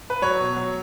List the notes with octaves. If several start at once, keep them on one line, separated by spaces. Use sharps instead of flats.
B4
F#3 C#5
B2
F#3